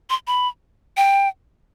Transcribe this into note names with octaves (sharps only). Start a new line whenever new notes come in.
C6
B5
G5